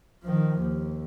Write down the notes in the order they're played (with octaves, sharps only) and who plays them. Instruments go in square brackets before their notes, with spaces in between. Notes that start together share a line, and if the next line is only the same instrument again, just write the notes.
[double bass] D#3 F3
D#2